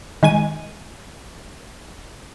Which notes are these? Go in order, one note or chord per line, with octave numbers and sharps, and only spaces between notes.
D#3 G#3 G#5 D#7